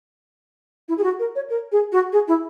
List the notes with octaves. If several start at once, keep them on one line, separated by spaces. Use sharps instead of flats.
E4
G#4
F#4
A#4
C#5
A#4
G#4
F#4
G#4
E4